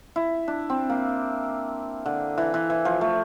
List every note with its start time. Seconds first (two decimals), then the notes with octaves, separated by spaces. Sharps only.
0.16 E4
0.48 D4
0.70 C4
0.90 A#3
2.06 D3
2.38 E3
2.54 E3
2.70 E3
2.85 F3
3.01 A3